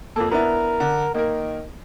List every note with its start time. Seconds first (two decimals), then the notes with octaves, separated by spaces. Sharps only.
0.16 F2 A#3 A4
0.31 B3 D4 E4 A#4
0.80 D3
1.14 D#3 A#3 A#4